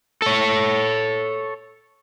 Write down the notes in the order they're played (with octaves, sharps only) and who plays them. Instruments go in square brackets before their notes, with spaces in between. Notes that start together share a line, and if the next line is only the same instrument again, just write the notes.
[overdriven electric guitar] A4 C#5